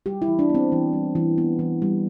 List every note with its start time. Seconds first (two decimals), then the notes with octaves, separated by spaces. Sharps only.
0.06 G3 G4
0.22 E4
0.28 E3
0.39 D4
0.50 B3
0.55 C4
0.72 E3
0.93 G3
1.15 E3
1.38 B3
1.59 E3
1.82 G3